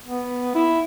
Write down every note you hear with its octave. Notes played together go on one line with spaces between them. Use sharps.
B3
E4